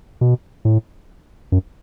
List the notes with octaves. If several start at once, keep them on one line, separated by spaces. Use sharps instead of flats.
B2
A2
F#2